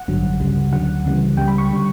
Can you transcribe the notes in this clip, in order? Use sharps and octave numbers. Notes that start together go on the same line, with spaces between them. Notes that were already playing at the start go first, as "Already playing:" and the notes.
Already playing: F#5
A1 G2 D3 F#3
C#2 C#3 G3
D2 D3 F#3 F#5
C#2 C#3 E3 G3
C#2 C#3 G3 G5
B5
C#6
D3 G3